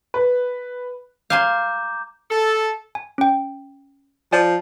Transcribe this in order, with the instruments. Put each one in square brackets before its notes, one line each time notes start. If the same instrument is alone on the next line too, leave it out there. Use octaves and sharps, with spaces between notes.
[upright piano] B4
[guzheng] F5 G#5 C6 [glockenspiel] A#5 D6 G6
[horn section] A4
[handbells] G#5
C#4 G5
[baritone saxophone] F3 [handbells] D5 G#5